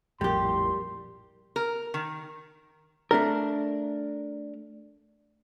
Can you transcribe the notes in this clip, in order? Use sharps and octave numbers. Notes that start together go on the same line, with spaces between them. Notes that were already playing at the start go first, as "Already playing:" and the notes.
A#1 F2 A2 G3 E4 G4 A#4 C6
A#4
D#3
A3 D4 A#4